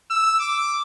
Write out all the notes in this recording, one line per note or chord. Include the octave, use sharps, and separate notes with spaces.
E6
D6